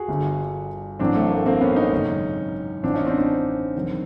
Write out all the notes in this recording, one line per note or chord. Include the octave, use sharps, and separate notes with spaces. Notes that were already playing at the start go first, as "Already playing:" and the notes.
Already playing: F#4 G#4
G1 G2 D3
A1 A2 F#3 C4 D4
A3
A#3
A#3 C4
B3 C#4
C#4 D#4
G#1 F#2 C#3
A1 A2 F3 C4 D4
C#4 D#4
C4 D4
C4 D4
E2 C3 D#3 F#3